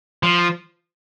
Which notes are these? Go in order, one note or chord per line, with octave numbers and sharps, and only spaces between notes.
F3